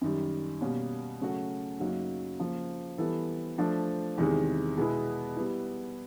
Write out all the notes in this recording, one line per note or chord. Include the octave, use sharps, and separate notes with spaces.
F#2 D#3 G3
B2 G3 A#3 C#4
C#3 F#3 A3 C#4 F#4
F#2 C#3 F#3 A#3 D#4
C#3 F3 A#3
E3 G3 B3 E4 A4
F3 A3 D4
E2 C3 D#3 G#3
B2 G#3 B3 E4
G3 B3 E4